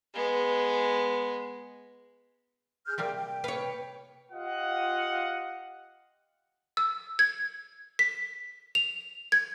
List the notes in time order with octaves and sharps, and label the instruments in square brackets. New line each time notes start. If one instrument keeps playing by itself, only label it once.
[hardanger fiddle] G#3 B3
[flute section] G#4 F6 G6
[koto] C3 G3 A#3 [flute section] G5
[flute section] G5
[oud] B4 C#5 [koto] F5
[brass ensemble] F4 G4 D#5 F5 F#5
[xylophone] E6
G#6
B6
F7
G#6